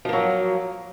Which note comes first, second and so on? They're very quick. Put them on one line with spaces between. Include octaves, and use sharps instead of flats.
F3 A#3 F#3